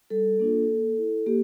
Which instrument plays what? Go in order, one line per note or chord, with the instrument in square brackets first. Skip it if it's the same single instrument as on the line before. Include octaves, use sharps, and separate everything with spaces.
[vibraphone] G3 A4
A#3 D4 F4
A#3
E4
A#3 G4